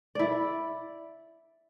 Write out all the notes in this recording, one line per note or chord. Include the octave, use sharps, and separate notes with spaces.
E4 D5